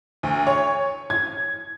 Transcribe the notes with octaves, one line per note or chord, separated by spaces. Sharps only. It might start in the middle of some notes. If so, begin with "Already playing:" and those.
D2
C#5
G#6